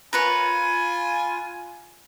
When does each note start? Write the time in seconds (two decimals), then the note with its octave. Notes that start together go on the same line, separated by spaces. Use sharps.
0.13 F4 A#4 B4 C#5 G#5